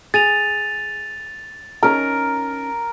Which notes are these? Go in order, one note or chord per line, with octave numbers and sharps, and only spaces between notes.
G#4 A6 D#7 F7
C#4 D#4 A#4